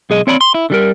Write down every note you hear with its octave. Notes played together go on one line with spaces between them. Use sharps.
B1 G#4 D#5
C4 C#5 D5 A#5 B5
C6
E4
D3 G3 A#4